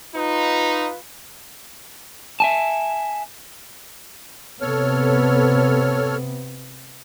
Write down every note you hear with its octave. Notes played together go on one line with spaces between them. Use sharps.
D#4 F4 B4
E5 G#5 A5
C3 B3 A4 C#5 F6